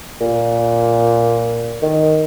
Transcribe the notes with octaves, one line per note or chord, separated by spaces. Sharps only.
A#2
D#3